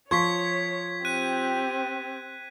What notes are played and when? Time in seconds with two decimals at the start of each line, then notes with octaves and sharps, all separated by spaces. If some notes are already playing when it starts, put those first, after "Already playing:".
0.11 F3 C#5 C6 C#6 G#6 B6
1.05 C4 G4 F#6 D#7